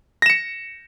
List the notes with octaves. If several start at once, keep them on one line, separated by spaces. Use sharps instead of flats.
A#6 C#7 E7